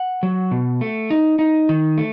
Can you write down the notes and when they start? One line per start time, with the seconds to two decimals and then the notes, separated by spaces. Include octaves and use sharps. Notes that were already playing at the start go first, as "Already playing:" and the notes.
Already playing: F#5
0.23 F#3
0.51 B2
0.81 A3
1.10 D#4
1.39 D#4
1.69 D#3
1.98 A3